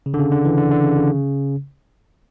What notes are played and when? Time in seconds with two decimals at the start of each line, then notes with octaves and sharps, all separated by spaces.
0.06 C#3
0.14 D3
0.19 C#3
0.32 D3
0.45 E3
0.58 D3
0.71 D3
0.84 C#3
0.97 C#3